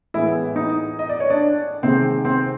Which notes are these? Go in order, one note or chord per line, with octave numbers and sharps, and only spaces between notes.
A2 E3 G#3 B3 E4 E5
D#4 D#5
D#5
D5
C#5
D4 D5
C3 D#3 G#3 C4 C5
C4 C5